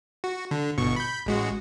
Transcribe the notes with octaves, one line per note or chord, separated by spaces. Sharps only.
F#4
D3
G1 B2 C#6
B5 G6
A1 G#3 F#4